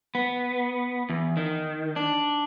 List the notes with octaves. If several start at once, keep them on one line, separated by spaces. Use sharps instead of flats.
B3
E2
D#3
D4